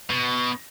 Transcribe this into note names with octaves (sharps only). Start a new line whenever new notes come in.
B2